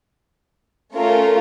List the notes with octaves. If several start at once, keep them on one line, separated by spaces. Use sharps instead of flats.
A3 C#4 F4 A#4